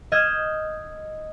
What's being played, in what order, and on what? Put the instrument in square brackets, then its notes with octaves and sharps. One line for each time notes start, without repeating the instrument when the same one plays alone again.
[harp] D#5 E6 F6 G6 G#6